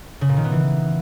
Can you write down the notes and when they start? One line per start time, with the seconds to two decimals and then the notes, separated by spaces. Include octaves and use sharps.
0.21 C#3
0.29 A#2
0.36 D#3
0.44 B3
0.52 E3